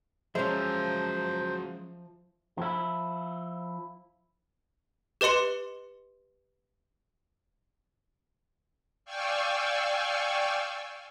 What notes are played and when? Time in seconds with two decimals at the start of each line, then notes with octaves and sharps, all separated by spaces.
0.35 F3 F#3 G#3 C#4 C5 E5 F5 A#5
2.58 F3 E4
5.21 G4 B4 D#5 C6 C#7
9.05 D5 F5 G5 G#5 C#6 E6